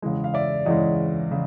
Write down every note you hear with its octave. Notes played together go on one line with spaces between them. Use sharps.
E2 C#3 E3 G#3
F5
D5 E5
E2 C#3 E3 G#3 C#5 D#5
C#3